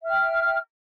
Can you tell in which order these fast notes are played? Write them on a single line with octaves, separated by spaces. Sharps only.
E5 F6 G5